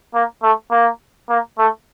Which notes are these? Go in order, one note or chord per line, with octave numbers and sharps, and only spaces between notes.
A#3
A3
A#3
A#3
A3